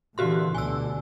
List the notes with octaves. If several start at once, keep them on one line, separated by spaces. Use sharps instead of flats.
A#2 D3 E3 F#4 G4 C6
D2 B2 D3 G#5 E6